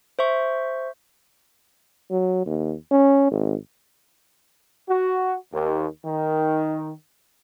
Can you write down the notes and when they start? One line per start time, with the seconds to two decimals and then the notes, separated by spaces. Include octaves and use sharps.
0.19 C5 E5 C#6
2.11 F#3
2.46 D#2
2.91 C#4
3.31 G#1
4.89 F#4
5.53 D#2
6.05 D#3